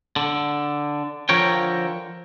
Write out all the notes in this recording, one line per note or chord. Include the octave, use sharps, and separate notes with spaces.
D3
D3 F3 A#4 C#5 G5